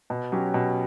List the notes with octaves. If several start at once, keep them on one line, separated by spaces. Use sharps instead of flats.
B2
F#3 C#4 G4
B2